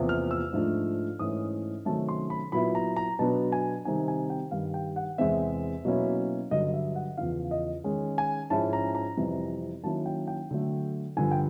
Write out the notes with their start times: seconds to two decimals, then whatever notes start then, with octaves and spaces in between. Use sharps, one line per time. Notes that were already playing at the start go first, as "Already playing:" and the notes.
Already playing: E2 C3 F3 A#3
0.09 F6
0.31 E6
0.53 G#2 F3 A3 D4
1.19 G#2 E3 A3 C#4 E4 D#6
1.85 C3 D#3 F#3 A3 C#4 A5
2.09 C6
2.30 B5
2.52 A#2 F#3 B3 E4 B5
2.75 A#5
2.96 A#5
3.19 B2 F#3 B3 D4 A5
3.52 G#5
3.85 C3 D#3 G3 C4 D#4 G#5
4.08 G#5
4.30 G5
4.51 G2 D#3 G3 F5
4.74 G5
4.96 F#5
5.18 E2 C3 E3 G#3 C4 E5
5.85 B2 F#3 A#3 C#4 E4
6.51 G2 D3 F#3 D#5
6.74 E5
6.96 F#5
7.17 E2 C#3 F3 F5
7.51 D#5
7.84 D#3 G#3 C#4
8.18 G#5
8.50 G#2 F3 G#3 C#4 E4 A5
8.73 A#5
8.95 A#5
9.17 F2 C3 E3 G3
9.83 D#3 F#3 A#3 C#4 E4 A5
10.06 G5
10.28 G5
10.51 D3 F#3 A3
11.17 G2 D3 F3 G#5
11.31 G5